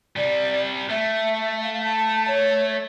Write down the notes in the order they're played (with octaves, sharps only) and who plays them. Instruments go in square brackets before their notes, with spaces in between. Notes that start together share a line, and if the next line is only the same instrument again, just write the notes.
[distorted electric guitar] C3 G3 [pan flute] D5
[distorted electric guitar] A3 [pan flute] E5
[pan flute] F5
A5
C#5